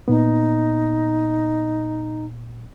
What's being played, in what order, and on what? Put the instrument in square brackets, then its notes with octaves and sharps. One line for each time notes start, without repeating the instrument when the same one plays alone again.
[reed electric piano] A#2 B3 [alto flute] D#4